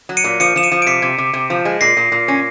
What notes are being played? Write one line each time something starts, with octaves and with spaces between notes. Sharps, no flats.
F#3
C#7 D#7
A#2
F3 C#7 D#7
F3 E7
C#7 D#7
F3
D7
C3 B6 C#7
C3
C3
C3
F3
G#3
A#2 A#6 C7
A#2
A#2
C#4